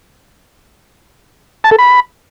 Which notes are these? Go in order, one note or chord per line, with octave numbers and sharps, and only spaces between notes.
A5
A4
B5